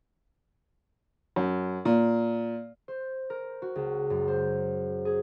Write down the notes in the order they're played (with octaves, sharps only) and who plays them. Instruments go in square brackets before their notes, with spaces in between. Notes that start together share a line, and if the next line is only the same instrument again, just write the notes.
[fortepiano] F#2
A#2
[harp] C5
A#4
F#4
C#2
F#2
C5
G#4